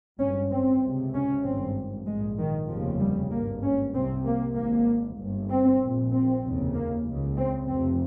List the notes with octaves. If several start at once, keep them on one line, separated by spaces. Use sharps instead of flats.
G#1 G2 C#4
C4
C#2 C3
C#4
G#1 G2 C4
A#1 G#2 G#3
D#3
F1 D#2 C#3 F3
G3
G#1 G2 A#3
C#4
C2 C3 C4
A#3
G#1 G#2 A#3
G1 G2
C4
A#2
A#1
C4
F1 D#2 C#3
A#3
C#2 C#3
C4
F1 F2 C3 C4